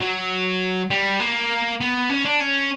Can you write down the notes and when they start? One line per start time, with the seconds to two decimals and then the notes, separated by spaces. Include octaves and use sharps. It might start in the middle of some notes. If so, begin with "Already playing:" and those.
0.01 F#3
0.90 G3
1.20 A#3
1.81 B3
2.10 C#4
2.25 D4
2.40 C#4